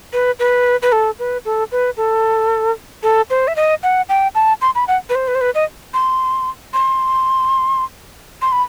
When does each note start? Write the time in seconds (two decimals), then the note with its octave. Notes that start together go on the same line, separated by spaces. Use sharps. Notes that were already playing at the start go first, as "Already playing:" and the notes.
0.13 B4
0.39 B4
0.82 B4
0.92 A4
1.19 B4
1.45 A4
1.72 B4
1.97 A4
3.03 A4
3.30 C5
3.48 E5
3.56 D#5
3.83 F#5
4.09 G5
4.35 A5
4.61 C6
4.75 B5
4.88 F#5
5.09 B4
5.15 C5
5.28 B4
5.35 C5
5.41 B4
5.55 D#5
5.94 C6
6.74 C6
8.42 C6
8.52 B5